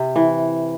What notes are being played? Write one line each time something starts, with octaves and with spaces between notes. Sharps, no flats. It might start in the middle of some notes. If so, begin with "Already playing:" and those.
Already playing: C3
E3